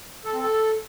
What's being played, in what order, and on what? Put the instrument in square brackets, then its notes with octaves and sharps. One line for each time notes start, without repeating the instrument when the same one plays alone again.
[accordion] A4
C4
A4